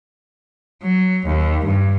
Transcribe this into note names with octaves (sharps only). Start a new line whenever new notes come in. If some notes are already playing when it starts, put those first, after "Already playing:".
F#3
D#2
G2